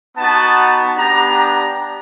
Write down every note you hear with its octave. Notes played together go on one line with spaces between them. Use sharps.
B3 D#4 F#4 A5
B3 D4 G4 A#5
A#5